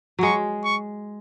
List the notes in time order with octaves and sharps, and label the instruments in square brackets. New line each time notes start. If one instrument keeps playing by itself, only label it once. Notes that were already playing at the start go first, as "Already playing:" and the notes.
[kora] F#3 G#3 [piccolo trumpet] C#6
[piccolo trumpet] C#6